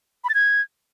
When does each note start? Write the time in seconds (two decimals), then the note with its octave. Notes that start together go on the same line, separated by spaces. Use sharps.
0.24 B5
0.29 A6
0.34 G#6